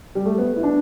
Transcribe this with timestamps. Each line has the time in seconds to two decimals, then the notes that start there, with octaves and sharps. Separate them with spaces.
0.15 G3
0.25 A3
0.38 B3
0.56 E4
0.63 D4